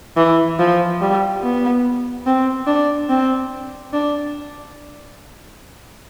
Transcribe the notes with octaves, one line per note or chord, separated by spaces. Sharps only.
E3
F3
G3
B3
C4
D4
C4
D4